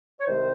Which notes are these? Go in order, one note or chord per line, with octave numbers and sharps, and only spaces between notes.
C#5
C2 C3 D#3 G#3 C5